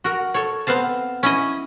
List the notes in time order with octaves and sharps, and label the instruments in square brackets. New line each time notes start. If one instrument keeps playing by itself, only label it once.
[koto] F#4 A#4
A4 C#5
B3 C4 F5 A5
C#4 E4 D#5